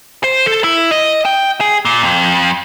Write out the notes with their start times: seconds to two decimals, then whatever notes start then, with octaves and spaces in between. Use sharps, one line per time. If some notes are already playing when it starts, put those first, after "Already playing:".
0.24 C5
0.46 A4
0.64 E4
0.91 D#5
1.25 G5
1.61 G#4
1.85 A#2
2.03 F2